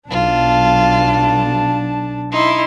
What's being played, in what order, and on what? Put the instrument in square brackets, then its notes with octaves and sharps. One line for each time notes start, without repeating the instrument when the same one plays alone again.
[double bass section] B1 [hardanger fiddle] D4 A5 [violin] F4
[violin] D#4 [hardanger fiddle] E4 C6